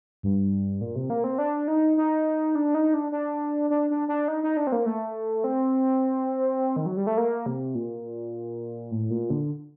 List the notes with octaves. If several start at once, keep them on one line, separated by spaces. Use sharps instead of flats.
G2
A#2
C3
A#3
C4
D4
D#4
D#4
D4
D#4
D4
D4
D4
D4
D4
D#4
D#4
D4
C4
A#3
A3
C4
D#3
F#3
G3
A3
A#3
C3
A#2
A2
A#2
D3